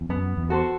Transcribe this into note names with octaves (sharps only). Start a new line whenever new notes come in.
E2
F#2 B3
E2
F#4 A4 C5